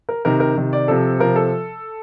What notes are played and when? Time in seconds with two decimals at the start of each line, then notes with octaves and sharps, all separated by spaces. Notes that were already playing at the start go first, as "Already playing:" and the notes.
0.09 A#4
0.25 C3 D#3 A#4
0.40 A#4
0.56 C3 D#3
0.73 D5
0.88 C3 F3 A4
1.20 C3 F3 A#4
1.36 A4